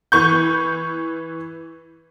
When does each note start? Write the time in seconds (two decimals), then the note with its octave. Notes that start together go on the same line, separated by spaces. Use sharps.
0.12 E3 C#6 G6